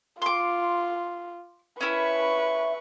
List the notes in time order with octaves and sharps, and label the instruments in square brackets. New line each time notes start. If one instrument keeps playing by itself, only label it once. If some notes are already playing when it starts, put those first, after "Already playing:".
[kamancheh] F4 [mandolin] C6 D6
[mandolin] C#4 E4 [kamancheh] B4 C#6